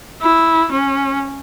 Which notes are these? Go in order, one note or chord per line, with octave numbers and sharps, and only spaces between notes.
E4
C#4